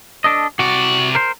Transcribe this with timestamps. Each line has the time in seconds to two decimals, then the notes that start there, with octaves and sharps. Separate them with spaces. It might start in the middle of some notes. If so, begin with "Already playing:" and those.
0.24 D4 A4 D#5
0.59 C3 F#4 D5
1.15 A#4 C5